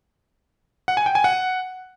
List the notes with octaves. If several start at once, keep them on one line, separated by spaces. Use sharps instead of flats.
F#5
G#5
G5
G#5
F#5